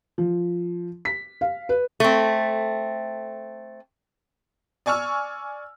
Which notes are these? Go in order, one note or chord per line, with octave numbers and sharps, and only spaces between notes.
F3
B6
F5
B4
A3 C4
D5 G#5 C#6 E6 F6